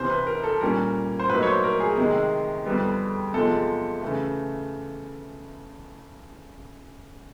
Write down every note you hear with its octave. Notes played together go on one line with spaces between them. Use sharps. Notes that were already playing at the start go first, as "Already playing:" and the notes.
Already playing: C2 C3 E3 C5
B4
A#4
A4
A#2 G3 A#3 C#4 A#4
C5
A2 F#3 A#3 D#4 B4
C#5
C5
A#4
G#4
C3 D#3 G#3
F2 D3 G3 B3
E2 C3 F3 G#3 A4
C#3 E3 A3